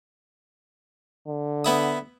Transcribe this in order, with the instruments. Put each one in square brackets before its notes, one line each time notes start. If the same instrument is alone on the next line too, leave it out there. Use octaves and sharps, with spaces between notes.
[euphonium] D3
[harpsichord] B3 E4 D#6